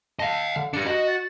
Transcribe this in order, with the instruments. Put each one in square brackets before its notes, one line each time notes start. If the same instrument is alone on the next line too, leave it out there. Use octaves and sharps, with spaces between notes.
[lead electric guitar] D#5 F5 [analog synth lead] A5
[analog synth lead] D3
[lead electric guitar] D4 G4 [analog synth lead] C#7
[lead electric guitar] F#4 [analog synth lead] D#5
[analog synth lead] A6